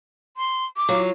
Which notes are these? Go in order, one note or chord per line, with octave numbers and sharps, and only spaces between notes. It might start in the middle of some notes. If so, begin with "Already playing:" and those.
C6
D6
F#3 F4